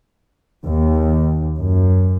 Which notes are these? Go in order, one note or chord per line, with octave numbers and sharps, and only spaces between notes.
D#2
F#2